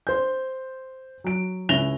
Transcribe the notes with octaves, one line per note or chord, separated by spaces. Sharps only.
C5 G6
F#3 D7
C#2 C#4 E4 A#6 F7 G7